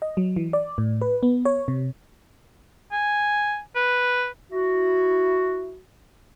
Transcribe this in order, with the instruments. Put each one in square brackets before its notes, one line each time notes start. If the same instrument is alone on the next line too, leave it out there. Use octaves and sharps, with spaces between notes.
[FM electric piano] D#5
F#3
E3
D5
A2
B4
B3
C#5
C3
[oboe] G#5
B4
[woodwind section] E4 F#4